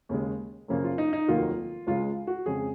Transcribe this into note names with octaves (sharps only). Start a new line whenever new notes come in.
D#2 C#3 G#3
F#2 C#3 F3 A#3
F4
D#4
D#4
F1 D#2 D#3 F#3 A#3 F4
C#2 C#3 G#3 F4
F#4
F2 C#3 G#3 G#4